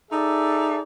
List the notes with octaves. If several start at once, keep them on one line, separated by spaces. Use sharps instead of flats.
D#4 G#4 A4 D5 E5